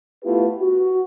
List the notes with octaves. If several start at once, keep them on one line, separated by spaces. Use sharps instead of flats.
A3 B3 E4 F4 G4 B4
F#4